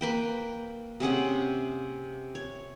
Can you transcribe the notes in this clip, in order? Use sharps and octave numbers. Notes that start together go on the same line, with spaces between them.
A#3 B4 G5
C3 C#4 G#4 F#5
C#5